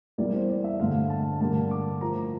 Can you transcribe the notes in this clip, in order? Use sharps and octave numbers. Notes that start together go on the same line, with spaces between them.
E2 E3 G3 A#3 D5
C5
D5
E5
G2 D3 A3 F5
A5
G2 D3 G3 A#3 A5
D6
A2 F3 A#3 A#5